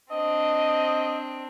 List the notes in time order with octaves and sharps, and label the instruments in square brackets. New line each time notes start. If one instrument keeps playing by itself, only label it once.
[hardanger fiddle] C4 D4 [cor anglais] D#5